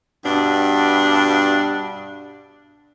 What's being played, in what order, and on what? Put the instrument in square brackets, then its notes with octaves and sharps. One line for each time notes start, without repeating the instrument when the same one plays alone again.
[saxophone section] G2 B2 D4